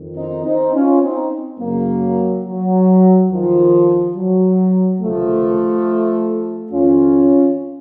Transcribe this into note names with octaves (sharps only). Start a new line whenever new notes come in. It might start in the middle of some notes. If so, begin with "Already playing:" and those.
Already playing: F2 D#3
C4 D#4
C4 D#4
C#4 F4
C4 D#4
F#2 C#3 F#3 A#3
F#3
D#2 D#3 F3
F#3
C#2 C3 D#3 F3 A3
F2 D#3 C#4 F4